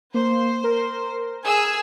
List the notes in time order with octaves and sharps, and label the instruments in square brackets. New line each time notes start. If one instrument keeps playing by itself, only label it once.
[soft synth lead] A#3 [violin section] C5
[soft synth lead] A#4
[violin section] G#4 G#5 E6